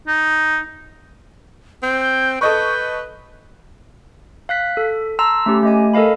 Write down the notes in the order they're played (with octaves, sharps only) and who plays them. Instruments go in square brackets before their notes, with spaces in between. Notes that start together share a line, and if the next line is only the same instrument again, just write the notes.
[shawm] D#4
[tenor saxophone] C4 [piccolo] G6
[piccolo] G6
[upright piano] A4 D#5 C#6 [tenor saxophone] B4 [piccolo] G6
[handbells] F5 F#6 B6
A4
A5 A#5 C6 E6
A3 C#4 G4
A3 D#5 G#5
A4 A#4 D#5 F5 B5